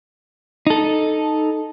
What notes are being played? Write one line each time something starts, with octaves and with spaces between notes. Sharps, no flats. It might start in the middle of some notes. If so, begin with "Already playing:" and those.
D#4 A4